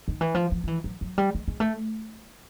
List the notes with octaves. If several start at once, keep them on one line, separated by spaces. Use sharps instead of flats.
D#3
E3
F3
F3
F3
E3
F#3
F#3
G3
G#3
G#3
A3